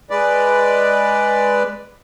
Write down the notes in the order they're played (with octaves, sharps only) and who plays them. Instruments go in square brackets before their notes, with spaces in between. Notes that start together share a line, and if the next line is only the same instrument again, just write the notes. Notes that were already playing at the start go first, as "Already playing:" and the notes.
[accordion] G#3 B4 D5